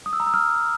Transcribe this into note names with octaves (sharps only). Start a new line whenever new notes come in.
D#6
E6
A#5
E6
F6